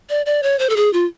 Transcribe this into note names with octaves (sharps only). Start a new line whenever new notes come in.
D5
D5
C#5
C5
A4
G#4
F4